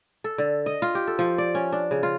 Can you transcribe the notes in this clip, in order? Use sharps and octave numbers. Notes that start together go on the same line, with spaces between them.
A4
D3
D#5
F4
G4
A4
F3
D5
C#4
D4
C#3
F4